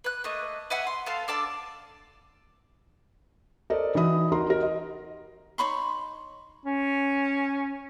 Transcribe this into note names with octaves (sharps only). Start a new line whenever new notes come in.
B4 F#6
A3 A#3 D#5
B4 E5 F#5 G#5
C6
B3 A4 F5 A5
D4 A4 D5 A5
A4 A#4 C5 D5 D#5
E3 D#4 F#4 E5 B5 D#6
D#4 F#4 A#4 A#5 C6
F#4 G4 A#4 D#5
D#5
D#4 C#5 B5 C6
C#4